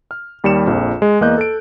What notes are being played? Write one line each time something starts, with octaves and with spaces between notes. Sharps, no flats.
F6
D#2 G3 C#7 E7
A#1 F2
G#3
E2 A#3 D#5 F#6 G6
A4 D7